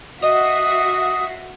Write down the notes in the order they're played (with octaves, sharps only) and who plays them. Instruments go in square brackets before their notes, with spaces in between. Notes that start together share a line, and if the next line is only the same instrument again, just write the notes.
[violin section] F#4 E5 C7 [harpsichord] D#5 [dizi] D#6